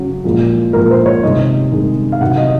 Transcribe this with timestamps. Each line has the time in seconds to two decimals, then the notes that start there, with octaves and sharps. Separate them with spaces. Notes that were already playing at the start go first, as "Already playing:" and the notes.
Already playing: C#3 F#3
0.24 A#2 F3 G#3
0.73 A#2 F3 G#3 A#4
0.91 C5
1.06 C#5
1.23 C3 D#3 G#3 D#5
1.72 C3 D#3 G#3
2.12 F5
2.21 C3 D#3 F#3 F#5
2.38 D#5